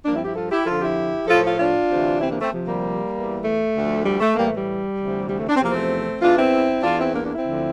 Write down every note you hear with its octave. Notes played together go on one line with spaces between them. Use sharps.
G2 F3 A#3 D4
C4 E4
E4 G4
F4 A4
E4 G4
F2 D3 F3 F4 A4
E4 G4
A2 F3 F4 A4
F4 A4
D4 F4
D2 C3 E3
C4 E4
A#3 D4
A3 C4
D2 C3 F3
G3 A#3
E2 E3
A3
D2 D3 F3
G3
A3
A2 E3 G3 A#3
A3
G3
D2 C3 E3
G3
A3
D4
C4
E2 C3 F3 A#3
A3 C4
E2 E3 D4 F4
C4 E4
E2 E3 D4 F4
C4 E4
A#3 D4
A#3 D4
C4 E4
D2 D3 F3